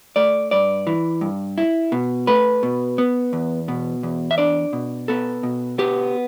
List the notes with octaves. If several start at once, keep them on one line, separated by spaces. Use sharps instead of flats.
A3 D5
G2 D5
E3
G2
E4
B2
A3 B4
B2
B3
E2
B2
E2
E5
D4 D5
B2
B3 A4
B2
B3 G4